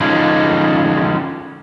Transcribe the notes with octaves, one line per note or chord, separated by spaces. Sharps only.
D3 F3 G#3 C#4 D#4